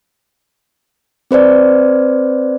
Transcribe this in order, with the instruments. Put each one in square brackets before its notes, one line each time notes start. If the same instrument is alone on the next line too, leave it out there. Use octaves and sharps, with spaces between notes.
[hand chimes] C4 B4 C5 D5